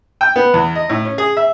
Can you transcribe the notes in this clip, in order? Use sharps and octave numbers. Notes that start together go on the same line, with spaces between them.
G5
B3
E2
D#5
A2
C#4
G#4
E5